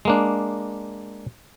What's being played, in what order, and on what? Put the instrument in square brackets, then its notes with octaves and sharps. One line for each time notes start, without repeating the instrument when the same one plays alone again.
[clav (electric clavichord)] G#3 A#3 D4